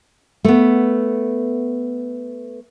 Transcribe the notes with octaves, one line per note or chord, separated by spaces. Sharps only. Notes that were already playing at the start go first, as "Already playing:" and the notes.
A3 B3